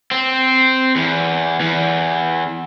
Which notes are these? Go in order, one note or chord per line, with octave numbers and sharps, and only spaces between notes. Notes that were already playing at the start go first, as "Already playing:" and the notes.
C4
E2
E2